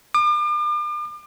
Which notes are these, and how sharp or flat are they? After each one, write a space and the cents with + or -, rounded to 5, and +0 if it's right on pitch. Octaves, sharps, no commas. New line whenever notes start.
D6 +40